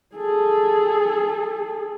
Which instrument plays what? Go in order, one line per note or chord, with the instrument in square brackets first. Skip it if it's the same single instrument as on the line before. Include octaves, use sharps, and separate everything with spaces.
[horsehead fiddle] G#4 A4